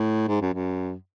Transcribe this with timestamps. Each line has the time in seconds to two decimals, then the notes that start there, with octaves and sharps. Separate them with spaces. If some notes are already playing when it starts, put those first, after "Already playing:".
Already playing: A2
0.28 G#2
0.41 F#2
0.54 F#2